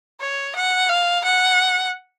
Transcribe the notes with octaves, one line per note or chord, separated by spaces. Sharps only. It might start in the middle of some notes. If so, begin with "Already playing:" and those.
C#5
F#5
F5
F#5